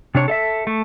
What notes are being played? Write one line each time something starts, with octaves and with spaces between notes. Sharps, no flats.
C3 D4 C#5
A4 D#5 E5
A3